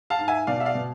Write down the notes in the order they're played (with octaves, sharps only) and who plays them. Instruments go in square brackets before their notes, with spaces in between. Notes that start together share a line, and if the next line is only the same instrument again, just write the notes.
[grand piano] F5 A5
G#2
E5 G#5
B2 D5 F5
E5
D5 F5
B2